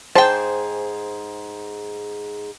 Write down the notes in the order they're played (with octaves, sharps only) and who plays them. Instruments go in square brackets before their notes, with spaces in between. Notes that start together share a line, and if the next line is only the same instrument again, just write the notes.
[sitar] G#2 G#4 [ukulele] C5 [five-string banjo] G5 A5